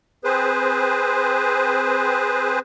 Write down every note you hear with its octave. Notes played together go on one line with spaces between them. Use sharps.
C4 G#4 B4 C5